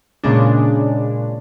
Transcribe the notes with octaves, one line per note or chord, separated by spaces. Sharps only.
A#2 C#3 G#3 D4